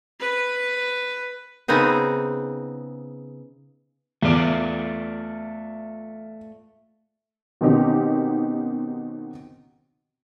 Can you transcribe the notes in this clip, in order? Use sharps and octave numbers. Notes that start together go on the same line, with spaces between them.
B4
C#3 B3 C4 D#4 G#4
E2 A3 F4 D5
B2 D#3 C4 C#4 D#4 G4